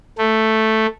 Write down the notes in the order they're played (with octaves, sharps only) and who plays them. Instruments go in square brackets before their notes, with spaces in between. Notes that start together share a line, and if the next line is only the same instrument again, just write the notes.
[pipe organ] A3